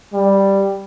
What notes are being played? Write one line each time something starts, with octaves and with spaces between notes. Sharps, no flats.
G3